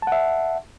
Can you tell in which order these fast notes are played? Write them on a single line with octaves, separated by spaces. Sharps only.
A5 F#5 E5